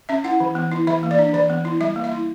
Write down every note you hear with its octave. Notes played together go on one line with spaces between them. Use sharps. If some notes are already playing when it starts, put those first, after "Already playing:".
C#4 E5
E4 F#5
E3
B3
E4
E3 E5
A#3
D5
D4
E3 D5
B3
E4
G3 E5
A#3
E5
E4